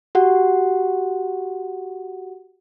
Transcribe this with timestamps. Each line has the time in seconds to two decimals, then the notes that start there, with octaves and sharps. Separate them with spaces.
0.15 F#4 G4 F#5